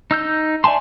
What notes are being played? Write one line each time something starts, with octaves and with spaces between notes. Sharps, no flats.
D#4 E6 G6
D5 E5 G#5 A5 C6